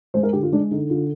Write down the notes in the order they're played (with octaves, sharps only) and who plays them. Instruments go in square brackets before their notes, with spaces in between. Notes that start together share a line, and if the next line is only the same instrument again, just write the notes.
[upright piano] G#3 C5
A#4
D3 G4
F4
G#3 D4
D3 D#4
D3 F4